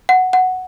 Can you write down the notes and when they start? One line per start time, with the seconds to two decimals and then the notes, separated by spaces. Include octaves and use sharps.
0.09 F#5
0.33 F#5